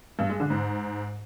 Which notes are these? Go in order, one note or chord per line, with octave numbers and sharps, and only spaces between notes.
G2
G#3
D3
G#2